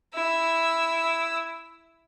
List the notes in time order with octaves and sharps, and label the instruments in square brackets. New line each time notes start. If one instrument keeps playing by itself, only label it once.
[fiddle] E4 E6